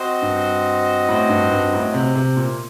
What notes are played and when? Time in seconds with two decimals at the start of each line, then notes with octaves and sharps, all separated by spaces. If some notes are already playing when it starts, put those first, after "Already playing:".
Already playing: C4 F#4 C5 D#5
0.22 G2
1.08 A2
1.29 G2
1.51 G2
1.73 A2
1.94 C3
2.15 C3
2.37 A#2